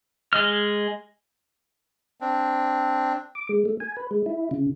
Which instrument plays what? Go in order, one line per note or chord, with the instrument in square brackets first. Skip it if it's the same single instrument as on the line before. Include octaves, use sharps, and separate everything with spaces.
[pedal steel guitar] G#3 D#5 F6
[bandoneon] C4 D4
[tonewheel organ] D6
G#3
A3
G#5
B4
G#3
E4
C#3